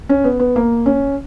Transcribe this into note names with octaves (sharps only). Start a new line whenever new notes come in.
C#4
B3
B3
A#3
C#4